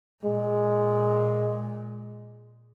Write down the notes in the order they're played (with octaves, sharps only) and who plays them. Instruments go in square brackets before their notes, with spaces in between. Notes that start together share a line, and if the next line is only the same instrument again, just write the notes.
[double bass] A#2 [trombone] G#3